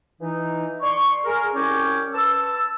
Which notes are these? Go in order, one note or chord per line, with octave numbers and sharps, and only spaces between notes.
E3 D#4
D5 C6 C#6
G#4 A#4
C2 C#4 C#5 G5 D6
B4 A5 E6